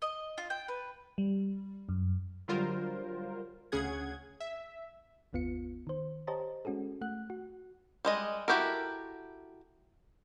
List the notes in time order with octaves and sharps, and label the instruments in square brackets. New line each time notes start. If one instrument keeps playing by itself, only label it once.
[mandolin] D#5
F4
G5
B4
[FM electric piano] G3
F#2
[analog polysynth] D3 F#3 G3 F4 A#4 C5
D2 C#3 C#4 G#4 F#5 G#6
E5
[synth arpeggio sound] G1 D#2 B3 F4 C#7
D#3 C5
G4 C5 C#5 D#5 A5 A#5
G#3 C#4 F#4 G#4 A4
A3 F#5 F#6
F#4
[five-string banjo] G3 G#3 D#5
E4 F#4 G4 A4 A#4